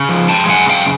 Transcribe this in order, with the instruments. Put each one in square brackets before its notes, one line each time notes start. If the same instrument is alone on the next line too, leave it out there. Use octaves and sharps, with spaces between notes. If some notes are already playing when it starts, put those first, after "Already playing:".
Already playing: [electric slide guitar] C#3
F3
G#3 G5 A5
C#3 F#5 G#5
F#2 F5 G5